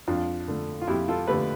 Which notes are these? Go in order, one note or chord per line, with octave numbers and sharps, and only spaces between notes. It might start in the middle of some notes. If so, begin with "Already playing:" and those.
F2 D4 F4
D3 A3
F4
F2 E4 G4
F4 A4
D3 A3 G4 B4